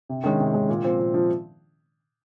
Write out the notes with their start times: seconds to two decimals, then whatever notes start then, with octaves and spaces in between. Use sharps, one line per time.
0.09 C3
0.24 D#3 G#3 C#4
0.39 C3
0.54 D#3 G#3 C#4
0.69 A#2
0.83 F3 C4
0.99 A#2
1.14 F3 C4